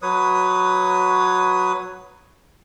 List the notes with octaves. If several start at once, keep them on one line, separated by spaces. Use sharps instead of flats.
F#3 B4 C#5 D#6